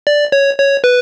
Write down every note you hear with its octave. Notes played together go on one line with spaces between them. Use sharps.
D5
C#5
C#5
B4